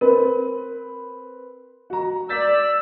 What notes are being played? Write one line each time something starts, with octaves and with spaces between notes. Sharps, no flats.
C4 A#4 B4
F#4 A#5
D5 E6 G6 A6 B6